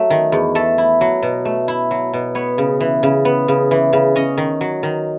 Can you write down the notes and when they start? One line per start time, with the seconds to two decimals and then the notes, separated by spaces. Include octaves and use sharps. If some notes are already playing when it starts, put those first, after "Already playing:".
Already playing: F#3 A3
0.10 D#3
0.32 E2
0.55 A3 A4
0.78 E4
1.01 F#3
1.22 B2
1.45 A3
1.68 E4
1.91 F#3
2.13 B2
2.35 B3 C#5
2.58 C#3
2.80 E3
3.03 C#3
3.25 B3
3.48 C#3
3.71 E3
3.93 C#3
4.16 C#4 D#5
4.38 D#3
4.61 F#3
4.83 D#3